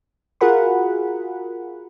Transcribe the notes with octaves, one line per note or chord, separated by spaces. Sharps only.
F4 F#4 G#4 A#4 F#5 B5